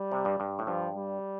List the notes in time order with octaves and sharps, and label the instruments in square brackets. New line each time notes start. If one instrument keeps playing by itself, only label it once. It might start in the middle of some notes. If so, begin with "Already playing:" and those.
Already playing: [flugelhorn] G3
[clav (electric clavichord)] C3
G2
G2
A2
[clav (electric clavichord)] G2 [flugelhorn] F3
[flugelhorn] G3